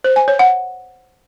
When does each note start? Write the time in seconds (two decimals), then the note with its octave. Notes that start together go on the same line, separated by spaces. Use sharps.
0.04 C5
0.16 G#5
0.28 C#5
0.39 F#5